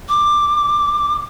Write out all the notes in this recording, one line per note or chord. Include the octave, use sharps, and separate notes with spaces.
D6